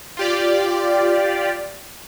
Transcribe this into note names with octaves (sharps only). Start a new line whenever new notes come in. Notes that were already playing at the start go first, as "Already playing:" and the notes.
F4 G4 D5